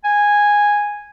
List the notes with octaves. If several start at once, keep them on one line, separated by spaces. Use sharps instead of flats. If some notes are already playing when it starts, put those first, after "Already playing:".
G#5